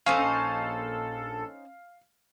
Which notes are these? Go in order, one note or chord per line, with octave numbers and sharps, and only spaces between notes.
A#1 C#4 D#4 A4 C5 F5